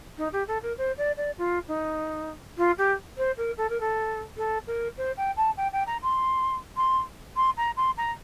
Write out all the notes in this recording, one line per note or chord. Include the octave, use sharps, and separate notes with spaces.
D#4
G4
A4
A#4
C5
D5
D5
F4
D#4
F4
G4
C5
A#4
A4
A#4
A4
A4
A#4
C5
G5
A5
G5
G5
A#5
C6
C6
C6
A#5
C6
A#5